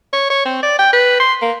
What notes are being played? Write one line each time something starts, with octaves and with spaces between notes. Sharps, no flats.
C#5
C#5
C4
D5
G5
B4
C6
A#3